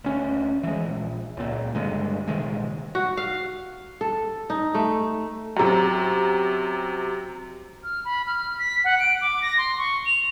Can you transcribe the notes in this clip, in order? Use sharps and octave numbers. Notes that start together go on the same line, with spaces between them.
D2 C#4
E3 G#3
A#1
C#2 A#2
G2 D3 G#3
A#1 C3 D#3 G#3
F#4
F5
A4
D#4
A3
F#2 C3
F6
B5
F6
B6
F#5
D7
D6
A#6
C6
C#6
F7